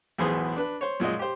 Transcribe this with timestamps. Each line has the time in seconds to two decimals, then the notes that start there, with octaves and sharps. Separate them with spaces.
0.18 B1 E2 A2 B3 G#4 C5
0.56 D4 B4
0.81 C5 C#5
1.00 F#2 A#2 G#3 D#5
1.19 G4 C5